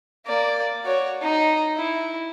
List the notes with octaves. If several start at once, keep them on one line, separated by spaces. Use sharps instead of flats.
A#3 D5
F#4 C#5
D#4
E4